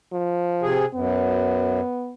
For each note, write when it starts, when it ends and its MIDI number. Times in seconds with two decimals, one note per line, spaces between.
0.13 0.76 53
0.62 0.85 48
0.62 0.85 68
0.94 1.80 42
0.94 2.14 59